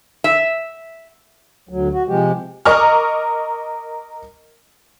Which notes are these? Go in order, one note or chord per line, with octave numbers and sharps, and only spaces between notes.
E5
D2 F#3
F#4
C3 F3 G#3 G4
A#4 D#5 A#5 C#6 D6 F6